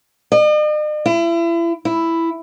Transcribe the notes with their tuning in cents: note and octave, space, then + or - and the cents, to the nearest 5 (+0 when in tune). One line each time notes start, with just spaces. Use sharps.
D#5 -45
E4 +35
E4 +5